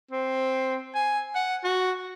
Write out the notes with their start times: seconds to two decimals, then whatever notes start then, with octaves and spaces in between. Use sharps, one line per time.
0.11 C4
0.95 G#5
1.35 F#5
1.64 F#4